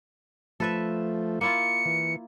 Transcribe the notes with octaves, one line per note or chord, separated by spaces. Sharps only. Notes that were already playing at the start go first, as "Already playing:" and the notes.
F3 A3 A4 B4 E5
A#3 E4 F4 C#7
E3